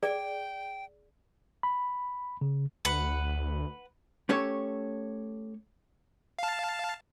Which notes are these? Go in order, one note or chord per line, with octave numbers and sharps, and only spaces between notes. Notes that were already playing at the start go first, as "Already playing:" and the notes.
G#4 D5 G5
B5
C#3
D2 B4 F#5
A3 C#4 G4 A4 C#5
F5 A5